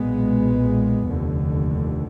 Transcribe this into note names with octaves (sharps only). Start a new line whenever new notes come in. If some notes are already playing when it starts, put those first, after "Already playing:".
Already playing: B1 A#2 G#3 B3
F1 D#2 D3